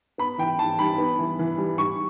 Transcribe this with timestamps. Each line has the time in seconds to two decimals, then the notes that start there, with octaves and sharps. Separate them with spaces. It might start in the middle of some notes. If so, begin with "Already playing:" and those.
0.18 B3 B5
0.38 E3 G5
0.59 E3 A5
0.79 G3 B5
0.98 B3
1.19 E3
1.39 E3
1.58 G3
1.78 G3 C#6